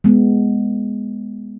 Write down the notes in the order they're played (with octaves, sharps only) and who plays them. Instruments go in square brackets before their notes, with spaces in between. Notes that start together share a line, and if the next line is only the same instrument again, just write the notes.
[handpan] G#3 B3